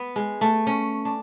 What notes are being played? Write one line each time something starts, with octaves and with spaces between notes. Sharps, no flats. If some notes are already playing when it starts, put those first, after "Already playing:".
Already playing: B3
G#3
A3
C#4
D4